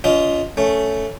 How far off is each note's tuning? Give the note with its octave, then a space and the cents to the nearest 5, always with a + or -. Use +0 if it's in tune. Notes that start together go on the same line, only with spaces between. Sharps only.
C#4 +40 F4 +0 D#5 +10
A3 +0 C#4 +10